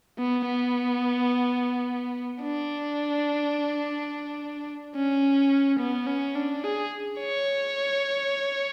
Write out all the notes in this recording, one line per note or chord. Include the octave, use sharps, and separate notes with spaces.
B3
B3
D4
C#4
B3
C#4
D4
G#4
C#5